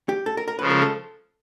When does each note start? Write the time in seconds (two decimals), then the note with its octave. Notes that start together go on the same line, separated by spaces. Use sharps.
0.09 G4
0.26 A4
0.37 A#4
0.48 A#4
0.59 C#3 F3 G#3 B4
0.70 A#4
0.82 A4